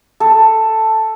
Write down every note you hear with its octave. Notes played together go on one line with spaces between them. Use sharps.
A4